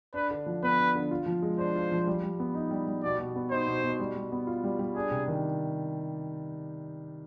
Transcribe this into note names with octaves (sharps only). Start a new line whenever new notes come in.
D4 B4
D3
F3
B3 B4
D4
D3
F4
F3
G#3
D4 C5
F4
F3
G3
G3
B3
D#4
G3
G3
B2 D5
B2
B3
D#4 C5
B2
B2
G3
G3
B3
F4
G3
G3
D4 G#4
C3
D#3